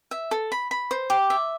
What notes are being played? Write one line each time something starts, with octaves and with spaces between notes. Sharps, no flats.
E5
A4
B5
B5
C5
G4
E5